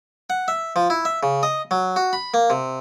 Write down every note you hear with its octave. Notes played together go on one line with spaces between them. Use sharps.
F#5
E5
F3
E4
E5
C#3
D#5
F#3
F#4
B5
A#3
C3